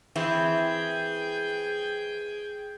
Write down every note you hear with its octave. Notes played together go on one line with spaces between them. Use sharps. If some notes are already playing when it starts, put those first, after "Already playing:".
E3 C4 E4 G#4 G5